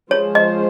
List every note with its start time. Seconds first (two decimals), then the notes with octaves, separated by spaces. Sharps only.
0.11 F3 G#3 C#4 G#4 C5 C#5
0.35 D#5